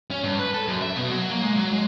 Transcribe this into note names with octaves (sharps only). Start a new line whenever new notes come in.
C#4
G2
B4
A4
F#2
E5
B2
F#3
A#3
G#3
F#3
G#3